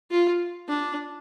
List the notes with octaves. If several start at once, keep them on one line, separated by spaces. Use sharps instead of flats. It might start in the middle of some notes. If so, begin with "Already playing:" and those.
F4
D4